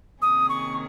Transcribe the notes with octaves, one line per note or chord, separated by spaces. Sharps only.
C3 D#3 A#3 C#4 G#4 D#6
C#6